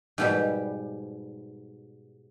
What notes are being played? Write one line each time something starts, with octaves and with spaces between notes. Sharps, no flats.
G#2 B2 G3